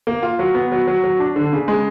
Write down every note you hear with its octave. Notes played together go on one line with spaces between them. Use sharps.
A#3
F4
F#3
B3
F#3
F#3
F#3
D4
D3
C#3
G#3